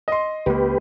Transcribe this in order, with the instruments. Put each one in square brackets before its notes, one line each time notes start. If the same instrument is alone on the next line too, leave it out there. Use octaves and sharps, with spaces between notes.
[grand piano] D#5 C6
[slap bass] C#2 A#3 [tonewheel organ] G4 B4